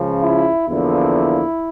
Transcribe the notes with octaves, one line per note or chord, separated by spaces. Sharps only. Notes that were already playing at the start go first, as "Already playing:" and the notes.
Already playing: C#2 C#3 F3
E4
E2 D3 F3 A#3 E4